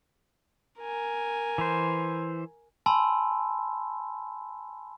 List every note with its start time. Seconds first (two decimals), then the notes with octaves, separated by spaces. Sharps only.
0.79 A#4 G#5
1.58 E3 C5
2.86 G#5 A5 B5 C6 E6